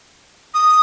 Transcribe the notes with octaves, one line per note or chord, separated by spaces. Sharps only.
D#6